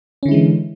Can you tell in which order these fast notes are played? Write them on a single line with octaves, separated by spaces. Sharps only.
C#4 D3 E4 G#3 E3